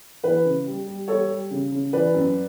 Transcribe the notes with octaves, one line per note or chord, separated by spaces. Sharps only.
E3 B4
C#3
G3
G3
G3 A4 C#5
G3
C#3
C#3
E3 B4 D5
F#2